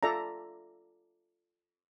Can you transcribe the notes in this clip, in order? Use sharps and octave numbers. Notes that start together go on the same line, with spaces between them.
F4 A4 D5 E5 A#5